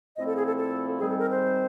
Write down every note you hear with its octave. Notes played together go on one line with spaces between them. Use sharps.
A#2 F3 A3 C4 E4 D#5
A4
G#4
A4
A4
G#2 D#3 G3 C4 G#4
A4
A#4
C5